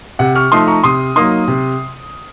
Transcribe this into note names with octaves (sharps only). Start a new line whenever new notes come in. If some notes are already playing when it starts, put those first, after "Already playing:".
C3 F#5
C#6 F6
F3 A3 D#4 C6 D#6
A#5 C#6
C3 C6 D#6
F#3 A#3 D#4 C6 D#6
C3